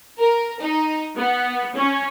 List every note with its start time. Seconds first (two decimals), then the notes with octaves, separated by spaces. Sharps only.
0.19 A#4
0.60 D#4
1.15 B3
1.76 C#4